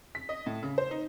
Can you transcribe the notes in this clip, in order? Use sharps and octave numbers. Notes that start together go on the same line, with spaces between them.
B6
D#5
A2
C#3
C5
D#4